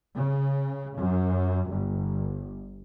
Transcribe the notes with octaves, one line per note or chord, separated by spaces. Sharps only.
C#3
F#2
G1